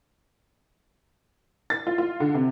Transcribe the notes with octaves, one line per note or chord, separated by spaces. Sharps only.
A6
F4
F4
D3
C3